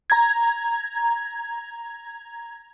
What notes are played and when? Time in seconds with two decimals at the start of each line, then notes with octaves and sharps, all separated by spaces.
0.10 A#5 G#6